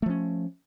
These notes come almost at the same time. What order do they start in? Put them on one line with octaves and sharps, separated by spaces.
A3 F3 C#4